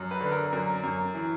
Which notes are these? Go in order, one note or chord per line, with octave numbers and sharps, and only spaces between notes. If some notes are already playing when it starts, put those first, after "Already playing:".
Already playing: F#2
B4
D3
A#4
F#2 A#4
F#2
E3